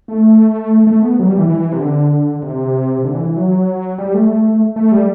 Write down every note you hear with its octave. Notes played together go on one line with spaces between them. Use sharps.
A3
A3
B3
F#3
G3
E3
E3
C3
D3
C3
D3
E3
E3
F#3
G3
A3
A3
G3